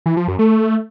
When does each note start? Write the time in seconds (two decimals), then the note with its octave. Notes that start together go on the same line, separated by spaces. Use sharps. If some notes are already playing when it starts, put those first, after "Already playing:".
0.06 E3
0.17 F3
0.28 F#2
0.39 A3